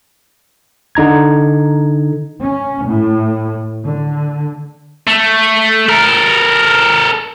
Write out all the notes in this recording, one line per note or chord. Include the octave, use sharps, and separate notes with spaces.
D3 D#4 A#5 G#6
C#4
A2
D3
A3
A4 A#4